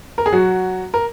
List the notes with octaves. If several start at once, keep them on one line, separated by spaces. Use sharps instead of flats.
A#4
G#4
F#3 F#4
A#4